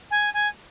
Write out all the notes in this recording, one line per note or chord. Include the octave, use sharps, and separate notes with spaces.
G#5
G#5